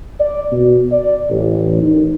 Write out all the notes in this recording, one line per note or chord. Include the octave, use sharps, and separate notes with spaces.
D5
B2
D5
A1
D#3